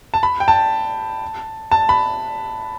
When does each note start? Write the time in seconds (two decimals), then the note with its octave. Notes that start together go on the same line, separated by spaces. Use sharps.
0.14 A5
0.23 B5
0.40 G5
0.48 A5
1.71 A5
1.89 B5